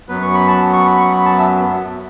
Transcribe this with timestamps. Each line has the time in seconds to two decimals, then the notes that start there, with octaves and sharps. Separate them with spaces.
0.09 F#2 F#3 B3 B4
0.22 C#6
0.34 B5
0.48 A5
0.73 C#6
0.86 B5
0.99 C#6
1.12 B5
1.25 A5
1.38 E5